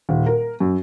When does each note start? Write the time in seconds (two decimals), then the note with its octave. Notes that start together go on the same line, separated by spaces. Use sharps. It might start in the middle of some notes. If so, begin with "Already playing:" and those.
0.09 D#1
0.26 A#4
0.60 F#2